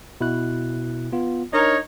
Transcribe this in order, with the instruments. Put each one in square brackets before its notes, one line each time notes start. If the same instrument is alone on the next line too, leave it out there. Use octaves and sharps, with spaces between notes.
[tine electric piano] B2 E4 F#6
B3 F4
[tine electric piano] D4 [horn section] D#4 A#4 C#5